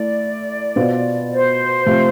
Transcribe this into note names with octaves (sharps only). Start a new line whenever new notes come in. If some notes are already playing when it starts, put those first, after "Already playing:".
Already playing: A3 E4 A4 D5
B2 B3 F4 C5
C5
C3 F3 A3 C4 F4